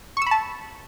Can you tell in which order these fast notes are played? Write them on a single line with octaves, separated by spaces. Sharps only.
C#6 E6 B5 A5